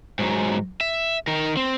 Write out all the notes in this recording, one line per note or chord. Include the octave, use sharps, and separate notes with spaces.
G#2 F#3
E5
D#3 A#4
C4